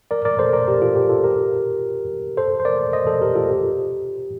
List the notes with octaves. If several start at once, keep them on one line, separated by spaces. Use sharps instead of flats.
A#4 D5
A#4 D5
A4 C5
A#4 D5
G4 A#4
F4 A4
G4
F4 A4
G4 A#4
A4 C5
C5
A#4 D5
C5 D#5
A4 C5
G4 A#4
F4 A4
G4